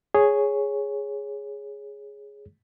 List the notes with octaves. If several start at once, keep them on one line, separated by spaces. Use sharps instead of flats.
G#4 C#5